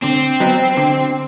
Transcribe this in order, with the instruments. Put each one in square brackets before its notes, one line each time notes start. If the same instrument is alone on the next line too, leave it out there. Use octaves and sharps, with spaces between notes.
[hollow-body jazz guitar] D3 [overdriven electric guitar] C4
[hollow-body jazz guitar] F#3 B3 D#4
D3